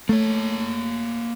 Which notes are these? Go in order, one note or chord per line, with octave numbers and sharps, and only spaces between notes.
A3 A#3 C#5